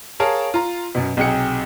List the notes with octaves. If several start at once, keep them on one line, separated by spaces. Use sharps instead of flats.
G#4 A#4 C#5 F5 A5
F4 A#5
F#2 B2
B1 C3 G#4 G5 C#7